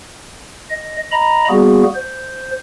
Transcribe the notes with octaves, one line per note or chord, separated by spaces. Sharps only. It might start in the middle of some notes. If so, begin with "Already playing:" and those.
D#5
D#5 A#5 B5
G3 A#3 B3 F#4 G#4
C5